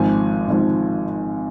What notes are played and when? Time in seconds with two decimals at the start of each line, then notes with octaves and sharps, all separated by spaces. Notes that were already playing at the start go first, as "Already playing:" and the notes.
Already playing: G#1 G#2 F3 G#5
0.48 G#1 G#2 F3